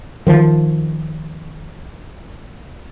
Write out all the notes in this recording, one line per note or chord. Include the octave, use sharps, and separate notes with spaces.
D#3 F3